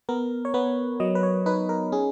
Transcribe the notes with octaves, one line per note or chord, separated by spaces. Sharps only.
B3 A#4
C#5
B3 B4
F#3 D#5
B4
C#5
D#4 B4
A#4
C#4 G#4